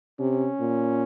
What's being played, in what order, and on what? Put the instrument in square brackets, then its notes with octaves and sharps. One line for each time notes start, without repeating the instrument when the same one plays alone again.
[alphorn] C3 [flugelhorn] C#4
[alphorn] A#2